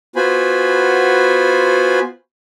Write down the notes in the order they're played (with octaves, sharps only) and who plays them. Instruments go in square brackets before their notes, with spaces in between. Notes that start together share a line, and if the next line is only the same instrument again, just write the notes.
[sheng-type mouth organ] B3 F4 F#4 C5 G#5 B5